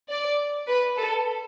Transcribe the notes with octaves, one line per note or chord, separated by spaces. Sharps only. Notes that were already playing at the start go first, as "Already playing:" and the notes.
D5
B4
A4